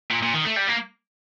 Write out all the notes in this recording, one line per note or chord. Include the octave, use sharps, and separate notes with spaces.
A#2
A#2
D#3
A3
G3
A#3